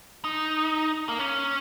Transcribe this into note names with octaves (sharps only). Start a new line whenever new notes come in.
D#4
A#3
C#4